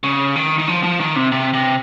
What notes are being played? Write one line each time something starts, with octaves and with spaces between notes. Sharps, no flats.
C#3
D#3
D#3
F3
F3
D#3
C3
C3
C3